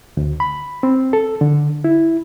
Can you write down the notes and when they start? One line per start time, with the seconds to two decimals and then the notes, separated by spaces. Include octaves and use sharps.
0.17 D2
0.40 B5
0.83 C4
1.13 A4
1.41 D3
1.84 E4